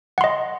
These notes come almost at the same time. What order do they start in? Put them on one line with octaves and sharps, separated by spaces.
F#5 C6 D#5